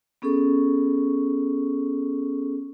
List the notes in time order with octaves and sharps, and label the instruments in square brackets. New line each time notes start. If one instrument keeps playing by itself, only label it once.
[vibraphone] B3 C#4 G#4 A4 C#6